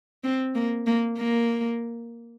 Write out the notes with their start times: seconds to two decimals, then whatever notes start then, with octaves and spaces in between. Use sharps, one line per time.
0.24 C4
0.55 A#3
0.87 A#3
1.18 A#3